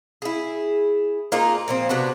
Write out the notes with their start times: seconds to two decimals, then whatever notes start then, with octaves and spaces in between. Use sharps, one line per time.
0.22 E4 G#4
1.32 A#3 D#4 F4 G#4
1.68 A#2 F3 C4
1.89 C3 B3 D4 F#4